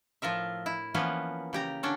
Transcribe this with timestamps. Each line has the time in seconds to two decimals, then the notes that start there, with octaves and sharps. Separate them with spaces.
0.22 A2 F3 F4 A#4 E5
0.66 E4
0.94 E3 F3 A#3 B3 C#4 B4
1.53 C#3 G4 A#5
1.83 D3 C#4 D4